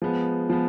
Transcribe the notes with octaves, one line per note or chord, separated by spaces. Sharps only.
F3 G#3 B3
F3 G#3 B3